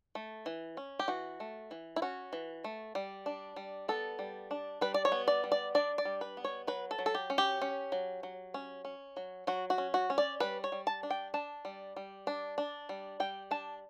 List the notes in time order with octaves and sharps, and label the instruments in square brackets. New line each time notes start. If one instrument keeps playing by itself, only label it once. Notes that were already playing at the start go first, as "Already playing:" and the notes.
[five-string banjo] A3
E3
C#4
G4
E3 F#4
A3
E3
E4
C#4 F#4
E3
A3
G3
D4
G3
B3 A4
G3
D4
G3 B4
D5
C#5
B3
D5
G3
D5
D4 D5
D5
G3
B4
B3
C#5
F#3 B4
A4
F#3
A4
G4
C#4
G4
C#4
F#3
F#3
C#4
C#4
F#3
F#3 F#4
F#4
C#4
F#4
C#4
D5
G3 B4
C#5
G3
A5
D4
G5
D4 A5
G3
G3
D4
D4
G3
G3 G5
D4 A5